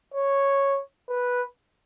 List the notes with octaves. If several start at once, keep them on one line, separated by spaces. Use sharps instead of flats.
C#5
B4